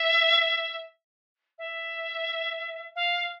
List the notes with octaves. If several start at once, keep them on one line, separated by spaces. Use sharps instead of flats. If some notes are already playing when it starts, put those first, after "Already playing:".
Already playing: E5
E5
F5